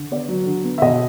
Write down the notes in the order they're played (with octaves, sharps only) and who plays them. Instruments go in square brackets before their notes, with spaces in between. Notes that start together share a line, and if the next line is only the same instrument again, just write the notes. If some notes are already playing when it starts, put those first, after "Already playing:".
Already playing: [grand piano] D3
B3 D5
F#3
D3
B3
E5
B2 D#5